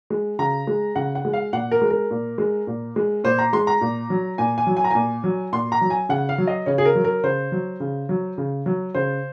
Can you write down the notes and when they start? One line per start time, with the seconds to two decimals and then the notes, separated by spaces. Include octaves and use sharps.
0.10 G#3
0.39 C#3 A#5
0.67 G#3
0.96 C#3 F#5
1.15 F#5
1.25 G#3
1.33 F5
1.53 A#2 F#5
1.71 A#4
1.81 G#3
1.90 A#4
2.11 A#2
2.38 G#3
2.67 A#2
2.96 G#3
3.24 A#2 C5
3.39 A#5
3.53 G#3 C6
3.67 A#5
3.81 A#2
4.10 F#3
4.38 A#2 G#5
4.58 G#5
4.67 F#3
4.77 G#5
4.84 A#5
4.91 A#2 G#5
5.24 F#3
5.52 A#2 C6
5.72 A#5
5.81 F#3
5.90 G#5
6.09 C#3 F#5
6.29 F5
6.38 F#3
6.47 D#5
6.66 C#3 C#5
6.78 G#4
6.85 A#4
6.95 F#3
7.04 A#4
7.23 C#3 C5
7.52 F#3
7.80 C#3
8.09 F#3
8.38 C#3
8.66 F#3
8.95 C#3 C5